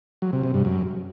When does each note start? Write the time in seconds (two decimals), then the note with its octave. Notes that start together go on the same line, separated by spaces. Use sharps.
0.22 F#3
0.33 C3
0.43 C3
0.54 G2
0.65 F#2